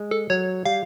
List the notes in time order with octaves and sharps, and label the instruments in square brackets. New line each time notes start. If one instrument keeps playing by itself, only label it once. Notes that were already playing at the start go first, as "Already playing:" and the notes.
Already playing: [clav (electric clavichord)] G#3
[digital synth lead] A4
[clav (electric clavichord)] F#3 [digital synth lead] C#5
[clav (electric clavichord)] G3 [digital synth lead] F5